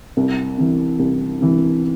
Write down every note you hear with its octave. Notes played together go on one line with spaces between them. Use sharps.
C2
C3 E3
C2
C3 E3